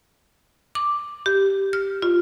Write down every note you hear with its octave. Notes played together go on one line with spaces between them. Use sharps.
D6
G4
F6
F4